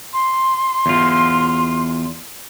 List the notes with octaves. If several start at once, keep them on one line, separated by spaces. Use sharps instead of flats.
C6
E2 F4